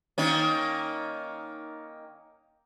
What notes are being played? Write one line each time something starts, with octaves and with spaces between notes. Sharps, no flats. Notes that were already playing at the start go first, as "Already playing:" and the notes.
D#3 A#3 C#4